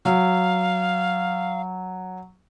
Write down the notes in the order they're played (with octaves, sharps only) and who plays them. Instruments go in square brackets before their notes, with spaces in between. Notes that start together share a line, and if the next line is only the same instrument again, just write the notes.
[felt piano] F#3 [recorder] F5